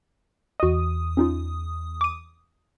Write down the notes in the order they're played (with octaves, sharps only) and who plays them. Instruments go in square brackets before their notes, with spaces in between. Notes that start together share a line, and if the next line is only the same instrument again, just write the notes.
[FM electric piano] E2 D#6 [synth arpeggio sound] F#4 D#5
[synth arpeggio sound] C#4 D#4 F4
D6 D#7